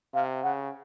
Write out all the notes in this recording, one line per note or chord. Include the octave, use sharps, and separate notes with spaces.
C3 F5
C#3 F#5